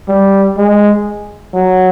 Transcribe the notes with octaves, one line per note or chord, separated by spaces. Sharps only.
G3
G#3
F#3